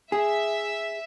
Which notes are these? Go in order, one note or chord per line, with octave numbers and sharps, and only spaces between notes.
G#4 E5